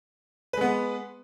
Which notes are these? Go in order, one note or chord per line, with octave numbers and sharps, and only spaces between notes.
G#3 B3 B4